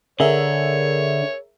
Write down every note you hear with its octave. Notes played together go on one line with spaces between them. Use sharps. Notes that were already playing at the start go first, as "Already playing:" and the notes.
D3 G#4 A#4 C#5 E5